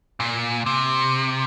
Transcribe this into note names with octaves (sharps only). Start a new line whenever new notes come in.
A#2
C3